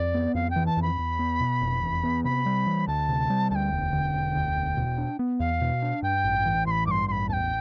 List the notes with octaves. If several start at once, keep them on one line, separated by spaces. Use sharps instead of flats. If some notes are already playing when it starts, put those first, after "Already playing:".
Already playing: F2 D5
B3
F2 F5
G5
E3
A5
F2
B5
E2
B3
B2
F1
E2
B3
C3 B5
G3
E3
D2 A5
C3
G3
D2 G5 A5
E1
D3
E1
D2
E1
B2
D4
B3
E2 F5
B2
D4
G2 G5
A1
E3
A1 B5 C6
G2 C6 D6
A1 B5 C6
E2 G5 A5